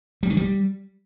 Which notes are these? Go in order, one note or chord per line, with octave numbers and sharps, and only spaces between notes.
G3
D#3
G3